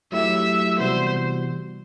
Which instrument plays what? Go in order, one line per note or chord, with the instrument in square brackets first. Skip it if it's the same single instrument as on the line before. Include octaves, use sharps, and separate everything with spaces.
[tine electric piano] F#3 A3 E4 G4 [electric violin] E5
[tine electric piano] C3 E3 G3 B3 F#4 [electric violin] C5